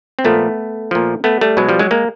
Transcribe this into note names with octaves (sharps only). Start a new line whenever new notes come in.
C4
A#2 F3 A3 B3
A#2 F3
A3 B3
G3 A3
B2 F#3 G#3
F3 G3
F#3 G#3
G#3 A#3